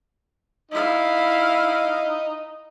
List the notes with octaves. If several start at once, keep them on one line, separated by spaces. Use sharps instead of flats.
D#4 E4 F5